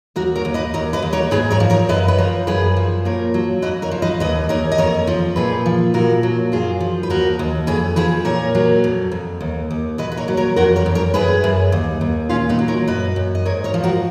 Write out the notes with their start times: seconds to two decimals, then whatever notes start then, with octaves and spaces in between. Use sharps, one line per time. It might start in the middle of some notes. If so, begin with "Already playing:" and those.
0.16 D#2 F#4 A#4
0.35 A#4 C#5
0.45 D#2
0.54 B4 D#5
0.74 D#2 A#4 C#5
0.93 B4 D#5
1.02 D#2
1.13 A#4 C#5
1.31 G#2 G#4 B4
1.50 A#4 C#5
1.60 F3
1.70 A#4 C#5
1.89 F#2 B4 D#5
2.08 B4
2.18 F3 A#4 C#5
2.47 F#2 G#4 B4
2.77 F3
3.05 A#2 A#4 C#5
3.34 F#3
3.62 F2 B4 D#5
3.82 A#4 C#5
3.91 F3
4.02 B4 D#5
4.20 D#2 B4 D#5
4.49 D#2 A#4 C#5
4.72 D#5
4.78 F2 A#4 C#5
5.07 F3
5.36 A#2 G#4 B4
5.66 F3
5.94 A#2 F#4 A#4
6.23 F#3
6.52 F#2 F4 G#4
6.80 F3
7.03 B4
7.10 D#2 F#4 A#4
7.39 D#2
7.67 F2 G#4 B4
7.96 F3 G#4 B4
8.25 A#2 A#4 C#5
8.55 F#3
8.84 F2
9.12 F2
9.41 D#2
9.71 D#2
9.98 A#2 B4 D#5
10.12 B4
10.17 A#4 C#5
10.28 F#3
10.37 A#4 C#5
10.56 F2 F#4 A#4
10.76 A#4 C#5
10.86 F2
10.95 A#4 C#5
11.14 F#2 G#4 B4
11.44 F#2
11.72 D#2
12.01 D#2
12.29 A#2 C#4 F4
12.49 B3 D#4
12.59 F#3
12.68 A#4 C#5
12.87 F#2 B4 D#5
13.16 F#2
13.35 D#5
13.45 G#2 A#4 C#5
13.64 A#4 C#5
13.74 F3
13.84 F#4 A#4